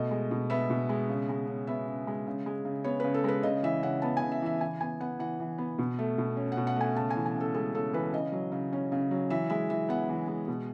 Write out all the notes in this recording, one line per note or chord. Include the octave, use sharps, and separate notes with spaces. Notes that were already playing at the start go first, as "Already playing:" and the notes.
Already playing: B2 A3 D#5
G#3
B2
B3 E5
B2
G#3
C#3
G#3
C#3
B3 E5
C#3
G#3
C#3
G#3
C#3
B3 C#5
C#3 B4
A4
G#3 B4
C#3 D#5
E3 E5
C#3 F#5
B3 A5
G#5
C#3
E5
E3 E5
E3 G#5
B3 G#5
B3 F#5
E3 F#5
E3
B3
B2
A3
B2
C#4
F#5
B2
F#5
A3 G#5
C#3 A5
E3 G#5
G#5
C#3
A4
G#3 A4
C#3 A4
E3 B4
C#3 D#5
F#3
C#3
C#4
C#3
F#3
E3 E5
G#3 E5
E3 E5
B3 F#5
E3
G#3
B2